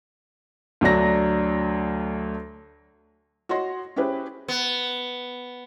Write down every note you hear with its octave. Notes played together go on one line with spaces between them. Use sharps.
D2 F#3 D4 A#6
F#4 C#5 D#5 C6 A#6
C#4 E4 G4 G#4 B4 C5
B3